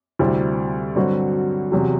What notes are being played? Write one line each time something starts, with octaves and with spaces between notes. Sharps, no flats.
D2 C3 G3 C4 E4
G2 D3 F#3 C4 F#4
E2 C3 F#3